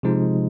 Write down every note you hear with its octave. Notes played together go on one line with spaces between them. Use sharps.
C3 F3 G#3 D#4